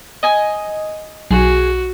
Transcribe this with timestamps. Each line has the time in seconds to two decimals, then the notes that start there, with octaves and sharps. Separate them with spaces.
0.23 D#5 G#5
1.31 B1 F#4 G#4